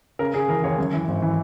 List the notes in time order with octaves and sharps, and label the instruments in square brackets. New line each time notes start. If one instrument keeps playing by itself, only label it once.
[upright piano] C#3 A#4
C#3 G#4
E3 A#4
D#2 C#5
F#2
E3
G#1
E3